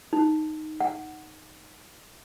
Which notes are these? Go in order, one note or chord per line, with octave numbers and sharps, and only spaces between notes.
D#4
F#5